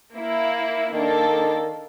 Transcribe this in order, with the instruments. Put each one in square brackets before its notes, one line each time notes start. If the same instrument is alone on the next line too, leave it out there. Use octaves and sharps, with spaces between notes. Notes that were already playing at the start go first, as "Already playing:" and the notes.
[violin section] A#3 E4
[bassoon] D#3 [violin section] A#3 D4 A4